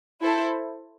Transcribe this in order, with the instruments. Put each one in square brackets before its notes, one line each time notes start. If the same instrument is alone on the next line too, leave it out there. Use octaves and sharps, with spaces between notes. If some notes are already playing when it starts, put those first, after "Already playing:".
[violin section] E4 A4 C5